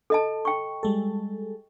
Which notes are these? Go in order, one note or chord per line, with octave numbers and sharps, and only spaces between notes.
A4 D#5 A5
G5 C#6
G3 G#3 A4